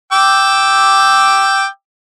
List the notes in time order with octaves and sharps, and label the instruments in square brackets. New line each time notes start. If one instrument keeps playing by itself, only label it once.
[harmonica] G5 D6 E6